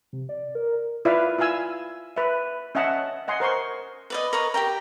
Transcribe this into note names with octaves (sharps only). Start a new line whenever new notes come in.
C3
D5
A#4
E4 F4 B4 D5 E5 F5
E4 F4 F5 G#5 E6
B4 E5
C#4 D#5 E5 F#5 A5
D#5 F#5 G#5 C6
A#4 C5 C6 C#6
B4 D5 D#5
A#4 B4 C#5 D#5
G4 A#4 G5 A#5